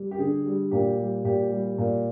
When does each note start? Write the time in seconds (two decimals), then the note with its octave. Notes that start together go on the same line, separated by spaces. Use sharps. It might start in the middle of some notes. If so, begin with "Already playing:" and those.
Already playing: G3
0.11 G4
0.19 D3 G#4
0.46 G3
0.71 A#2 G4
0.98 G3
1.24 A#2 G4
1.51 G3
1.78 A#2